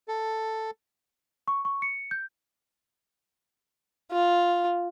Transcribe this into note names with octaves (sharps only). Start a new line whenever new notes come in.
A4
C#6
C#6
C#7
G6
F4